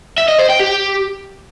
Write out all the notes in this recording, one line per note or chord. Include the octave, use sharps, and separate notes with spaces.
E5
D#5
C5
G5
G4